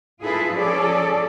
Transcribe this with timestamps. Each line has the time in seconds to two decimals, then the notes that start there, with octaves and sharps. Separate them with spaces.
0.23 E4 F4 G#4 A4 B4
0.55 F3 C#4 G#4 A4 D5